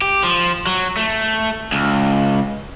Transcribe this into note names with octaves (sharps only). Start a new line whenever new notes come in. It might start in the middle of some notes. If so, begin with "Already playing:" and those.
G4
F3
F#3
A3
C#2